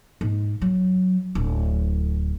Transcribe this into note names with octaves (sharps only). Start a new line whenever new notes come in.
G#2
F#3
D1